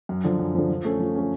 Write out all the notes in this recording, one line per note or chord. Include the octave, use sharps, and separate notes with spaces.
F#2
D3 F3
F#2
D3 F3
F3
A3 C#4
F3
A3 C#4